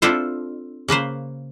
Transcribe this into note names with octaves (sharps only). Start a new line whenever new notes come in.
C4 D4 E4 F4 A4 C5
C#3 A#3 B4 C5